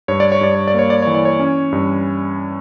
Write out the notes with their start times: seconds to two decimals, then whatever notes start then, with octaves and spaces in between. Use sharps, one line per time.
0.08 G2 C#5
0.20 D5
0.32 C#5
0.41 G2 D5
0.55 C#5
0.68 D5
0.74 A#3 C#5
0.90 D5
1.02 E3 C#5
1.15 D5
1.25 C#5
1.40 C#4
1.72 G2